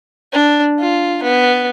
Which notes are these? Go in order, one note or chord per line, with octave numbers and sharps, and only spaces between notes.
D4
F4
B3